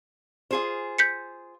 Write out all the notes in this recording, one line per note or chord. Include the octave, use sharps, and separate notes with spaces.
F4 G#4 C5
G6 B6 C#7